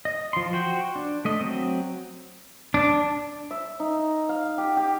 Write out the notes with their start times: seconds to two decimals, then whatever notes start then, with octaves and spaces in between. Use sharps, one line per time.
0.05 D#5
0.33 F3 C6
0.53 F#4 C5 G5
0.96 D4
1.25 A3 D#5
1.40 F#3 C4
2.74 D4
3.51 E5
3.80 D#4
4.29 F5
4.58 G4
4.77 G4